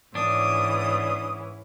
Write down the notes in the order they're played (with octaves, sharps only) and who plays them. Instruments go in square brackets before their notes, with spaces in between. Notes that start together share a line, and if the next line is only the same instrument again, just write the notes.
[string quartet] G#2 E3 C#4 [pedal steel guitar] D4 [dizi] D#6